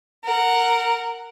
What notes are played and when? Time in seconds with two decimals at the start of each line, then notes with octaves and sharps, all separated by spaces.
0.23 A#4 F#5